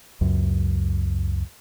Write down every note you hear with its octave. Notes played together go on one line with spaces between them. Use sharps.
C#2 F#2